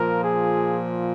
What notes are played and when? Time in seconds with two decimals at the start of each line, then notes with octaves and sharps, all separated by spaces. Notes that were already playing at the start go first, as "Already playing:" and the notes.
Already playing: A#2 F3 A#4
0.23 G#4